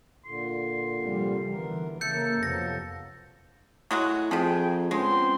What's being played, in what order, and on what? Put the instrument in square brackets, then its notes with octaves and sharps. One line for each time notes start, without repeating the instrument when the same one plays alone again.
[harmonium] A#2 D3 [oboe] C6
[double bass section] C3 F3 G3
[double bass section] D3 E3 [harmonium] B3 A#4
[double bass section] C#3 A#3 [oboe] A4 [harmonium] E5 [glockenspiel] G6 C#7
[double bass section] F2 C3 [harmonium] F3 F#3 B3 [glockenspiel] A#6
[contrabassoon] A2 [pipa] F#3 G#3 F#4
[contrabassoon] F2 [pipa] C3 F3 [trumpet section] G#4 G5
[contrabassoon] C#2 [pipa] G#3 [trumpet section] B3 C4 C6